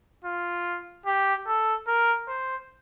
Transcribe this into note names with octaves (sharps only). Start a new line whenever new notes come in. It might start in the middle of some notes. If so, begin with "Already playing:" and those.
F4
G4
A4
A#4
C5